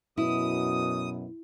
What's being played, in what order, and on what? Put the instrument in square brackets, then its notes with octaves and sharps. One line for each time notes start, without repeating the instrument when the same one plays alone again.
[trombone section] F#2 B2 [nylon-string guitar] E4 [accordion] D#6